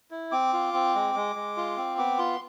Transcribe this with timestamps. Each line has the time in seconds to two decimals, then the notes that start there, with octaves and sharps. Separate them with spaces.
0.11 E4
0.32 C4 D6
0.53 F4
0.74 C4
0.95 G#3
1.15 G#3
1.36 G#3
1.57 F4
1.77 C4
1.98 B3 D6
2.18 F4 C6